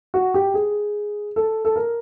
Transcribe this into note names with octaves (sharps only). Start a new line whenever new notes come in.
F#4
G4
G#4
A4
A4
A#4